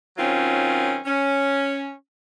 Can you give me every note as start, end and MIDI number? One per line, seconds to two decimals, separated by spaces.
0.16 0.97 51
0.16 0.97 54
0.16 0.97 60
0.16 0.97 61
0.16 0.97 65
1.05 1.89 61